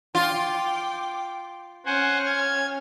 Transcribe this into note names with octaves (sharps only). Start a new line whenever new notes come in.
F4 G5 D6
C#4 C5 F#5 G#5 F6
G#6